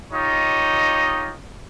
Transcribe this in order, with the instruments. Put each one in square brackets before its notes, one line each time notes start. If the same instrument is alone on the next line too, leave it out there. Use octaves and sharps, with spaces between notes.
[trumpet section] D#4 F4 G4 C#5 D#5